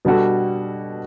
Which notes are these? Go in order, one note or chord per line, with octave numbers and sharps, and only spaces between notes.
B2 G3 D4 F#4 A4